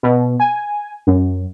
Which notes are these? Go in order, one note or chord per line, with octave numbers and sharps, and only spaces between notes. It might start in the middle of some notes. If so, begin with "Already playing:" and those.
B2
G#5
F#2